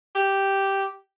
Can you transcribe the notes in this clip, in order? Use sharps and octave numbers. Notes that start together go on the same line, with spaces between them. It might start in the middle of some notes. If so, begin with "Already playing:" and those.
G4